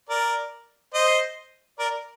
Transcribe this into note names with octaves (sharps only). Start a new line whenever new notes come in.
A#4 D5
C5 D#5
A#4 D5